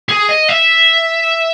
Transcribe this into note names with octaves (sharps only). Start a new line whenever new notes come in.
G#4
D#5
E5